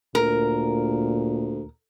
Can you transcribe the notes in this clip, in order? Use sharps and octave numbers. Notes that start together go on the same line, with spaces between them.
D2 A#2 A#4